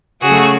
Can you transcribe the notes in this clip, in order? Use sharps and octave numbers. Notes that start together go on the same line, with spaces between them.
C#3 F#3 A3 F#4 G#4